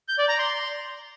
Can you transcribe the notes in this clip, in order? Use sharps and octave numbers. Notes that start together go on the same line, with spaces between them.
G6
D5
A#5
C6